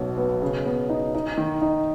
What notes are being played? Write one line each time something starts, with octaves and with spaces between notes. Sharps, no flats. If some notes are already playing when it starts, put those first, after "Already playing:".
Already playing: B1 F#2 B2
B3
C#3
B3
D#4
D#4
D#3
D#4